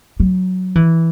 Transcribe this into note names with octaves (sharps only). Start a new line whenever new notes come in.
F#3
E3